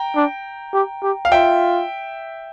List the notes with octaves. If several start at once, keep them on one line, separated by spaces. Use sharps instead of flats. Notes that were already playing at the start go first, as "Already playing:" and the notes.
Already playing: G5 A#5
D4
G4
G4
F5
F4 E5 G5